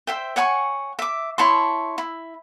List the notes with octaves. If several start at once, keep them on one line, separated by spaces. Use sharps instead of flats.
C5 E5 G5
C#5 F#5 G#5 C#6
E5 D6
E4 C#5 A5 C6
E4